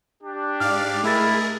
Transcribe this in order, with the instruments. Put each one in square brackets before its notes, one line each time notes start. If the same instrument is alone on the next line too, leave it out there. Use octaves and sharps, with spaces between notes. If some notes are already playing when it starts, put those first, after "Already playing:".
[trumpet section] D4 G4
[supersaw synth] G#2 D5 F5 [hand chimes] F6
[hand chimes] A3 A6 [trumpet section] E4 [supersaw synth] G#4 A#4